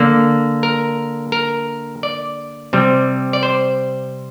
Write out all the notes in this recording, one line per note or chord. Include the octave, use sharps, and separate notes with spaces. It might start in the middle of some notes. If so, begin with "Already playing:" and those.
Already playing: D3 A#3
A#4
A#4
D5
C3 G3 C4
D5
C5